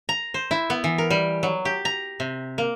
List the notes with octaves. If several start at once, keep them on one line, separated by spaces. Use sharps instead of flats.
A#5
C5
E4
B3
E3
A#4
G3
F#3
G4
A#5
C3
A#3